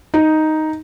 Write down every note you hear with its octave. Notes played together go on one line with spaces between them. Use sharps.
D#4